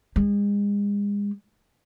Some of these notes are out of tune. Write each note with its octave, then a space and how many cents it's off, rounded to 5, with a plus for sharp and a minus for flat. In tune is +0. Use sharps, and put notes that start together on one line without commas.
G#3 -35